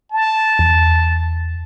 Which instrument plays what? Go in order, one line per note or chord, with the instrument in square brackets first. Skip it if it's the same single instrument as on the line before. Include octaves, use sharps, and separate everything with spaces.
[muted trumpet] A5
[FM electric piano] E2